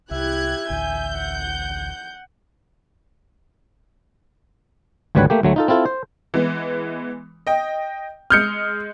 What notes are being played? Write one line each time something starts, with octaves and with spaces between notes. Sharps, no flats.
C2 E4 G4 E5 F#6 G#6
A1 D2 G#5 G6
F#5
G#1 D2 G3 B4 C#5 F#5
A3 A#3 G4
D2 F#3 A3
D#4 F4 A4
C4 E4 F4 A4
C5
E3 G#3 B3
D#5 G5
G#3 D#6 F6 G6 C#7